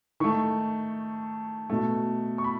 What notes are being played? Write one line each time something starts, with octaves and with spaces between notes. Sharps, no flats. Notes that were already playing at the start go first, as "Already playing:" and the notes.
D#3 A3 C#6
B2 A3
C#6
B5